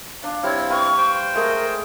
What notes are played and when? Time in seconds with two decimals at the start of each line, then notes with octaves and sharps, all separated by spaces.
0.24 D4 F5
0.43 G3 C4 E4 C#5 F5
0.70 B4 F5 C#6
0.98 C5 G5
1.35 G#3 A3 G#4 A#4